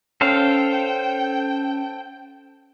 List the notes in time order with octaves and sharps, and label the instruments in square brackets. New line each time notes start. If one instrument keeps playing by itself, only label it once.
[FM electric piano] C#4 [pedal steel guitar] A4 C5 F5 [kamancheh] G5